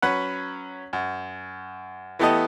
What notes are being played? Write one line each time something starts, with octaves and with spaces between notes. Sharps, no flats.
F#3 C#4 B4 F#5
F#2
E3 A3 B3 G4 A4 D#5